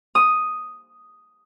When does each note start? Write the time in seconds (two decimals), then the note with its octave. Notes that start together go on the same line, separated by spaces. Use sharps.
0.15 D#6